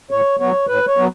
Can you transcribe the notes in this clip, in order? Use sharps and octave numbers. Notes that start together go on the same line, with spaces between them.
A2 C#5
F#3 B3 C#5
A2 B4
C#5
F#3 B3